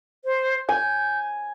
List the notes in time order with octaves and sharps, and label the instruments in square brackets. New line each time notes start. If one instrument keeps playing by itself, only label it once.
[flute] C5
[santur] G#5 [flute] G6